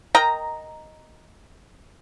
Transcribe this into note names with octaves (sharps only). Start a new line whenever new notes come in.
A#4 D#5 G5 A#5